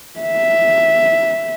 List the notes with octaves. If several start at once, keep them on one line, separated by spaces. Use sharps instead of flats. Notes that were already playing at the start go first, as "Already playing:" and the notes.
E5